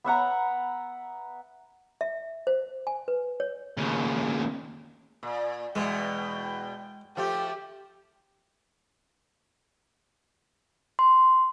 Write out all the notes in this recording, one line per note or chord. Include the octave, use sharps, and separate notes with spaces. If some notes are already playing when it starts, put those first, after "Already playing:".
B3 E5 F#5 A#5
E5
C5
G#5
B4
C#5
D#2 C#3
A#2
E2 B2 G#3 G5
F3 A3 G4
C6